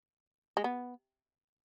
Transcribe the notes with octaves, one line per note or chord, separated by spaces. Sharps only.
G#3
B3